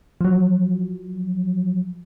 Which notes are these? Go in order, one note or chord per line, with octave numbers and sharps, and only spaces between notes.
F3 F#3